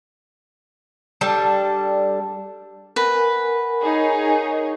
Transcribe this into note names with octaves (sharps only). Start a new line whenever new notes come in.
G3 D4 A4
A#4 B4 F#5 G#5
D#4 G#4 C#5